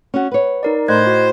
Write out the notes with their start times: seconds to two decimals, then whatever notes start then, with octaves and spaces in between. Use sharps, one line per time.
0.14 C#4 F#4
0.31 B4 C#5
0.63 D#4 A#4 D5
0.88 A2 C5 D#5 F#6 G#6
1.07 F#4